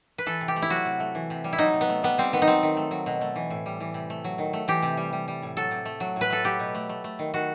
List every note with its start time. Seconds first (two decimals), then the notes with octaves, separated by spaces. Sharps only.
0.18 B4
0.26 E3 A4
0.41 C3
0.48 G4
0.56 A3
0.62 E4
0.70 F#3 F#4
0.85 C3
1.00 A3
1.15 E3
1.30 C3
1.44 G3
1.53 E4
1.58 F#3 D#4
1.73 C3
1.81 B3
1.89 A3
2.03 G3 B3
2.18 G3 C4
2.32 D#3 B3
2.42 D#4
2.47 F#3 C4
2.63 D#3
2.77 A3
2.91 F#3
3.06 B2
3.21 A3
3.36 E3
3.50 A2
3.66 G3
3.80 E3
3.94 C3
4.10 A3
4.24 F#3
4.38 D#3
4.53 A3
4.68 E3 G4
4.83 C3
4.97 G3
5.13 G3
5.28 G3
5.42 A2
5.57 F#3 A4
5.71 C3
5.85 A3
6.00 F#3
6.16 A2 B4
6.30 A3 A4
6.45 F#3 G4
6.59 B2
6.75 A3
6.89 A3
7.04 A3
7.19 D#3
7.34 D#3 F#4